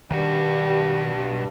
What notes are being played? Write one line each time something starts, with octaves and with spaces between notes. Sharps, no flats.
B1 G2 D#3 G3 F#4